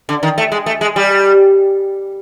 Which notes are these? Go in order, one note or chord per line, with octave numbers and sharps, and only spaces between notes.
D3
D#3
A3
G#3
A3
G#3
G3